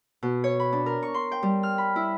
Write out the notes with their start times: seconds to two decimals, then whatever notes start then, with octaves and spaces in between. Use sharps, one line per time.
0.23 B2
0.44 C#5
0.60 B5
0.73 D4
0.86 A#4
1.03 C#6
1.14 C6
1.31 G5
1.43 G3
1.63 F6
1.78 B5
1.96 E4